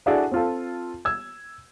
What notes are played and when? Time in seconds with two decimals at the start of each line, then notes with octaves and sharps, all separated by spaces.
0.06 D4 E4 F#4 G#4 A4 D5
0.32 C4 F4 A4
1.05 E6 G#6